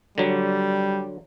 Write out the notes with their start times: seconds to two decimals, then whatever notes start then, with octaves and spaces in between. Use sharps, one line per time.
0.18 D3 F#3 G3